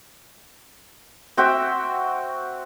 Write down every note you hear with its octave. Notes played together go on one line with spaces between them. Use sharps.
C4 F#4 E5 G5